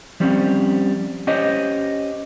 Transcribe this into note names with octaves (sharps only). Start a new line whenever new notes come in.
F3 G3 C4 C#4
C#4 G4 C5 C#5 D#5